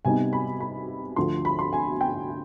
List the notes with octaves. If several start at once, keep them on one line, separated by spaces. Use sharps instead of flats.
C3 G3 B3 D#4 G#5
B5
B5
D2 D3 F3 C6
B5
C6
G#5
G5